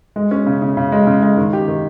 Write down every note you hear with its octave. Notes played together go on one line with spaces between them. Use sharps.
G#3
C#4
C#3
C#3
C#3
G#3
C#3
G#3
D#3
G4
D#3